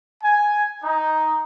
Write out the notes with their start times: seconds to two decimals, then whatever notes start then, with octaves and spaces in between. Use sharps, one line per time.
0.24 G#5
0.84 D#4